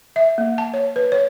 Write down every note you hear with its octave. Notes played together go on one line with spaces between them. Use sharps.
E5
A#3
A5
C#5
B4
C#5